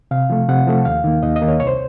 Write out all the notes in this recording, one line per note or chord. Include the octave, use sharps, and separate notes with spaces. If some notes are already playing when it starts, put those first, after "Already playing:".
C3 F5
F3 A3
C3 F#5
F3 A3
D#2 F5
D#3 A#3
D#2 D#5
D#5
D#3 A#3
C#5
C2 C#5
C5